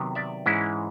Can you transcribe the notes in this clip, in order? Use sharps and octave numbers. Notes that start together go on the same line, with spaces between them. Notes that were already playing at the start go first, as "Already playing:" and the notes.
Already playing: C3 D#3 F#3 B3
D5 E5
G#2 E3 G#3 C#4 E4